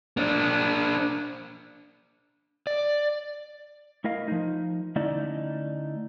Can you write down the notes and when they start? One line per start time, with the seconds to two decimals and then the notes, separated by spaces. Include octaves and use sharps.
0.17 A#3 D4
2.67 D5
4.04 A3 E4 A#4 D#5 F5
4.28 F3 D#4
4.96 D3 A3 C#4 D#4 E4 D5